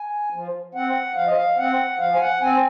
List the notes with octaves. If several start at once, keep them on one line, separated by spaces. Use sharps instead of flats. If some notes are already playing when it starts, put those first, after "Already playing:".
Already playing: G#5
F3
C4 F#5
F3 F5
D#5
F5
C4 F#5
F3 F5
G#5
F#5
C4 G#5